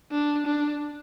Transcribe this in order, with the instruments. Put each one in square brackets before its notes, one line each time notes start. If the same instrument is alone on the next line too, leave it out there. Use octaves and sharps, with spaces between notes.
[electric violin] D4
D4